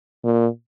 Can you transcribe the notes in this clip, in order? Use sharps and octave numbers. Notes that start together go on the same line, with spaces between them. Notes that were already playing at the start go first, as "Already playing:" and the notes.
A#2